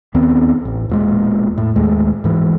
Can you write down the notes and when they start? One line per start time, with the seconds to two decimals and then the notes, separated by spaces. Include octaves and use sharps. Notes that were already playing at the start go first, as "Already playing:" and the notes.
0.14 D#2 D#3 B3 C4
0.65 A1
0.90 E1 A#2 G#3
1.58 A2
1.76 D#1 D#2 G#3 A3
2.24 G#2 E3